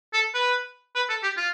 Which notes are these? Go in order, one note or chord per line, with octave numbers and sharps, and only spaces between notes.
A4
B4
B4
A4
G4
F4